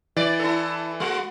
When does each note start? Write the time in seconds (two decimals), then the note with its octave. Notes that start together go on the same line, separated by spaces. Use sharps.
0.17 E3 D5
0.39 E4 A4
1.00 G#3 F#4